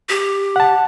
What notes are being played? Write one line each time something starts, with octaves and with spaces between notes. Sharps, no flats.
G4
F#5 A5